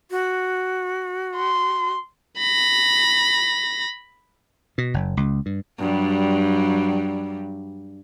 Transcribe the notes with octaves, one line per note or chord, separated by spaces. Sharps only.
F#4
C6
B5 A#6
B2
F#1
C#2
G2
G2 F#3 G3